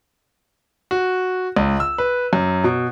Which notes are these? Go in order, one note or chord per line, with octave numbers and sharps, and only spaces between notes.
F#4
C#2
E6
B4
F#2
B2